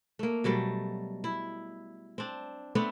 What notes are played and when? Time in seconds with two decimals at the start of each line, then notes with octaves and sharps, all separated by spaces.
0.19 A3 A#3
0.44 B2 F#3 G3 A3
1.24 E4
2.18 C4 D4
2.75 A3 B3 C4 D4